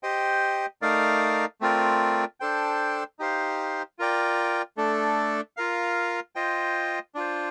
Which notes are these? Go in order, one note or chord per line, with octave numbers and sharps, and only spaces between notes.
G4 C5 D#5 G5
A3 D#4 A#4 D5 F5
A3 C4 F4 A#4 D5
D4 A4 C5 G5
D#4 G4 C5 F5
F4 A#4 D5 G5
A3 D4 A4
F4 A#4 F5
F4 C5 D#5 G5
D4 F4 C5